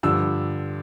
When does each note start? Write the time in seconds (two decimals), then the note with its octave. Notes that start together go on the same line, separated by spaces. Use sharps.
0.03 G2 D3 F3 E6